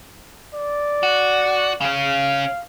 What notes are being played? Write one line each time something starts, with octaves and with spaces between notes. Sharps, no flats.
D5
F#4
C#3 C#4 F5